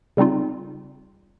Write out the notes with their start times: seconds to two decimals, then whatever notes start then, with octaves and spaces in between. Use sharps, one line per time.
0.17 C#3 G3 C4 D#4 F4